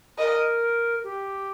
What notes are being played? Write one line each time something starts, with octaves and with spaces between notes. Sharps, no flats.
A#4 D#5
G4